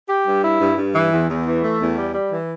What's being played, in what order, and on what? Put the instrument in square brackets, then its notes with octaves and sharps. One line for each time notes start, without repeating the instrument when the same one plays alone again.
[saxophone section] G4
G2
E4
G2
G2
E3
E2
E2
E3
A3
E2
G3
G3
E3